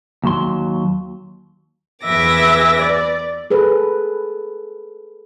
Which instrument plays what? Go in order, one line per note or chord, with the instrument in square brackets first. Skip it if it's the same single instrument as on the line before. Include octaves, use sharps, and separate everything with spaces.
[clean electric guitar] D#2 F#3 C6
[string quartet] E2 G#4 B4 E5 D6 A#6
D5
[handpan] G#4 A4 B4